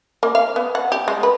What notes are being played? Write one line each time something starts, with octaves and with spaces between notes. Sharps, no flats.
A#3
F5
B3
F#5
G4
G#3
B4